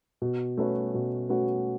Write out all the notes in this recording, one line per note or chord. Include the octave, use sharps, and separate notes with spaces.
B2
A3 C#4 F#4 B4
B2
A3 C#4 F#4 B4